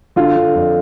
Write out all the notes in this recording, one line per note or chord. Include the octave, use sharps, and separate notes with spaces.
D3 F4
D3
F2